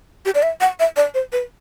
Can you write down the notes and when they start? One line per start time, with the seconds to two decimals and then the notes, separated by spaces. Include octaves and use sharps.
0.25 G4
0.35 D5
0.43 E5
0.61 F#5
0.80 E5
0.96 D5
1.14 C5
1.32 B4